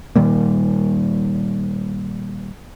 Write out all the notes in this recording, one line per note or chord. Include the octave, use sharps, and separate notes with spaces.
A#2 D#3 G3 A#3